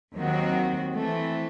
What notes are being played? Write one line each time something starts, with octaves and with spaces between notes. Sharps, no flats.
D#2 D#3 F#3 C4 F#4
E3 A3 C4